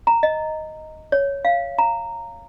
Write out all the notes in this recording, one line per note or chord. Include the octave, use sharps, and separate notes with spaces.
A#5
D#5
C#5
F5
A#5